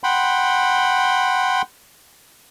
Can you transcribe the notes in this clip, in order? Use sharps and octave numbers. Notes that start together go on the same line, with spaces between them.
F#5 G5 B5 C6